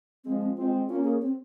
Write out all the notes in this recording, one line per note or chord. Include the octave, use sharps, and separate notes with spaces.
F3 G#3 C4
C4
G#3 C4 F4
A#3 C#4 F4
G#4
C4